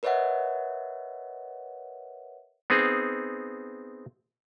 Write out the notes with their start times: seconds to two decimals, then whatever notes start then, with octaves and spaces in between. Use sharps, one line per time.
0.03 A#4 B4 C#5 D#5 E5 F#5
2.70 B3 C4 D#4 G#4